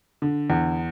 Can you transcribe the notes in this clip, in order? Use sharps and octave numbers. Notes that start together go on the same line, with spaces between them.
D3
E2